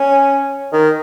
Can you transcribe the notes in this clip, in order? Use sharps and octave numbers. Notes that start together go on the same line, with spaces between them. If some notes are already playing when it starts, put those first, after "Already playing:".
Already playing: C#4
D#3